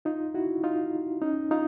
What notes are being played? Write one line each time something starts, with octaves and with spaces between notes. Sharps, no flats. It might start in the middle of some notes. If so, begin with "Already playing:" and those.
D#4 F4
E4 F#4
D#4 F4
C#4 D#4
D#4 F4